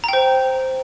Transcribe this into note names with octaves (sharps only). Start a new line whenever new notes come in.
C5 G5 A#5